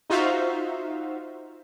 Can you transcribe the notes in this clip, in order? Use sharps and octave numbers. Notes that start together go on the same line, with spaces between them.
D#4 F4 F#4 C5 E5 F5